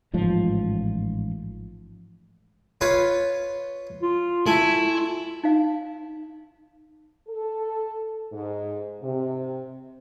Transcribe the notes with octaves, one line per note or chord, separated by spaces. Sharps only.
A1 G#2 F3
F4 B4 C#5
F4
A3 E4 G#5
F4
D#4 F5
A4
G#2
C3